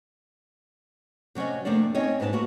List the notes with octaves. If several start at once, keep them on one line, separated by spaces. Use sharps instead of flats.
C3 F#3 C#4 D5 D#5
F2 C3 A3 A#3 D4 D5
C4 C#4 D#4 C#5 D#5
G#2 B3 D#4 C5 A5
A#3 F#4 B4